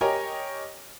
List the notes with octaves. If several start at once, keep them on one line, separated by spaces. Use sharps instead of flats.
G4 A#4 C#5 D#5 G5 G#5